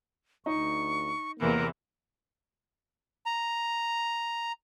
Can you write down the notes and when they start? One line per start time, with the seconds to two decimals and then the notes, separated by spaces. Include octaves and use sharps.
0.46 D2 D#4 C#6
1.39 E2 C3 E3 A#3 A#4
3.26 A#5